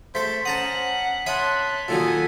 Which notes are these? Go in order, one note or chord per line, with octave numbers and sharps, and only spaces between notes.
A3 A4 C5 B6
C#4 F#5 A5 A#5 D#6
C#5 E5 A5 B5 C6 D#6 F#6
A#2 D#3 F#3 A4 G#5 D#6